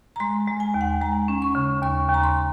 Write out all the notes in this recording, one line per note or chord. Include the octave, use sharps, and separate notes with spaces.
A#5
G#3 C6
G#3
G#5
D#2
F#5
G#3 A#5
C#4
C#6
C#3
D#2 C#6
D#2 A#5
C6